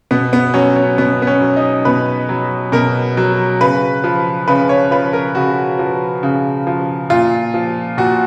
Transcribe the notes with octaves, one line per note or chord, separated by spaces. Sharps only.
B2 B3
B3
F#3 C#4
C#4
B2 B3
B3
C#4
F#3
D#4
B2 B4
F#3
B2 A#4
F#3
C#3 B4
F3
C#3 B4
C#5
F3 B4
A#4
C#3 F#4
F3
C#3
F3
A#2 F4
F3
A#2 F#4